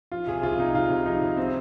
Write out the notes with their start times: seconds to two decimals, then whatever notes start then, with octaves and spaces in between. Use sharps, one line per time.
0.12 F3 F4
0.27 C2 G#4
0.43 C2 F4
0.59 C3 D#4
0.75 C2 F4
0.90 C2
1.06 F3 D#4
1.21 C2
1.37 C4